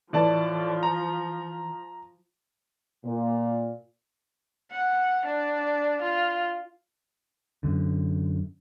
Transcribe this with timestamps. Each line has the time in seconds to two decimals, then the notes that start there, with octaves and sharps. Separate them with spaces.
0.13 A2 E3 F3 D5 A5
0.83 A#5
3.05 A#2
4.71 F#5
5.25 D4
6.01 F4
7.63 F#2 D3